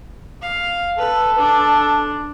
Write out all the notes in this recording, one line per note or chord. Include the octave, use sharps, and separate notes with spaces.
F5
A4 B4
D4